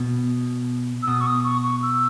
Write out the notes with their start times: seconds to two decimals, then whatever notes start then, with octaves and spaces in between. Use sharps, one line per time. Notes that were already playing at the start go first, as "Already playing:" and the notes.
Already playing: B2
1.03 E6
1.07 B2 D#6
1.21 C#6
1.26 D#6
1.45 C#6
1.63 C#6
1.83 E6